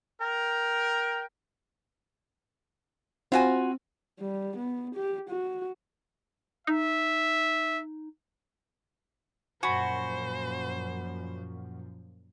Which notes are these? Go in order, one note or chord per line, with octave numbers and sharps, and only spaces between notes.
A#4 G5
C4 F4 F#4 G#5
G3
B3
G4
F#4
D#4 E5
F#2 A#2 F3 F#4 C5 G#5 B5